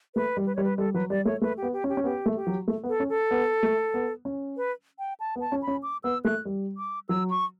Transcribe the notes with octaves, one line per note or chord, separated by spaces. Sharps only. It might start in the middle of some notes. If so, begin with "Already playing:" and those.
A3 B4
G3
B4
G3 C#5
B4
G3 A4
F#3 B4
G3 D5
A3 C#5
A3 B4
G4
B3
G4
C#4
G4
C#4
B3 G4
A3
G4
F#3
A3
B3
A4
C#4
A4
B3
A3
B3
C#4
B4
G5
A5
B3
A5
C#4
B5
C#4
D6
B3 E6
A3 F#6
G3
D6
F#3 E6
C#6